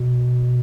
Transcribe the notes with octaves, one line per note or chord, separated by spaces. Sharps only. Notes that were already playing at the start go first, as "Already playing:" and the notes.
Already playing: B2